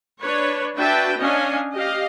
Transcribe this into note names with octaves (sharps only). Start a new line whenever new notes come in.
D4 B4 C#5
D4 F#4 B4 E5 G5 A5
C#4 D4 D#5 F5 G#5
G4 D#5 F5